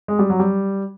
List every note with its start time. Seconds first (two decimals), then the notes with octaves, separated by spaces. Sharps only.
0.08 G#3
0.19 G3
0.30 F#3
0.39 G3